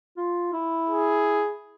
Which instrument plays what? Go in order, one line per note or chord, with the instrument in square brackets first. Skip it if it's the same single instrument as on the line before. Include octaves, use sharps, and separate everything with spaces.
[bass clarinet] F4
E4
[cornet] G#4